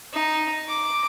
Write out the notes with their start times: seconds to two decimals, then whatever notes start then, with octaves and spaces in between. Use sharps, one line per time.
0.13 D#4
0.68 D6